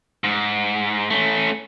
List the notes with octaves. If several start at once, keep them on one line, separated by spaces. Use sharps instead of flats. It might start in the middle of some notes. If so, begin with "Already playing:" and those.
G#2
A3 C#4